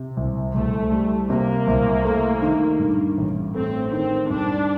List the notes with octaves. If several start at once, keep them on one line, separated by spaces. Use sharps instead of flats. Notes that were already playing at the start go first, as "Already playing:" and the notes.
Already playing: C3
C2
C2 A3
G3
C3 A#3
C2
A3
D#3
G2
A1
A3 C4
D#3 C4
G2 D4